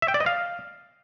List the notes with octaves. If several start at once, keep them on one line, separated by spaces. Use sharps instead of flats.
E5
G5
D5
D#5
F5